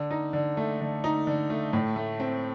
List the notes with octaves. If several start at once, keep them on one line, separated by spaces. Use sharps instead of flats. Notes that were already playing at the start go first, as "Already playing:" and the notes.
Already playing: D3
D#4
D3
A3
D3
D#4
D3
A3
A2
A3
C4